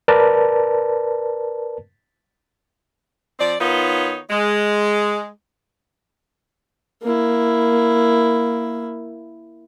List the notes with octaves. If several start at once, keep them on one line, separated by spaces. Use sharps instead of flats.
A#4 B4 D5 A5
F3 C4 D5
D#3 B3 D#4 F4 C#5
G#3
A#3 E4